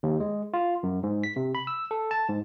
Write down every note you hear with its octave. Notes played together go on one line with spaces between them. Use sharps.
D#2
G#3
F4
F#2
G#2
B6
C3
B5
E6
A4
A5
G#2